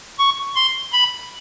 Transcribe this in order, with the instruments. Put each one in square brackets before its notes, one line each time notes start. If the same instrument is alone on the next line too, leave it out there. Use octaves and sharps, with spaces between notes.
[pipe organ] C#6
C6
B5